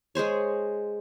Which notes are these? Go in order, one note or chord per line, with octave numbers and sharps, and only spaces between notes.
G#3 G#4 C5 C#5